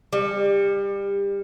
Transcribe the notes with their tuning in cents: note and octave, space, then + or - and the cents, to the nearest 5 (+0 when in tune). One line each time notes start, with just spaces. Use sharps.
G3 +25